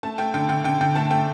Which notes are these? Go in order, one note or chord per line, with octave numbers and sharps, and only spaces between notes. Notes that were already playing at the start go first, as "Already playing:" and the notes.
A3 A5
A3 G5
D3 G5
D3 G5
D3 G5
D3 G5
A3 A5
A3 G5